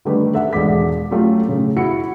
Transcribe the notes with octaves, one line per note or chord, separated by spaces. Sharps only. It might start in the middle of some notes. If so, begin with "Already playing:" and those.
D3 D#3 G3 A3 G4 B4
A4 E5 F#5
E1 G#2 G#3 D4 D6 B6
F#3 A3 C#4 F4 G4
A2 C#3
E4 F#4 C#7